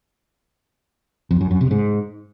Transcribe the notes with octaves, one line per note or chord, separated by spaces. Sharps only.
F2
F#2
F#2
C3
G#2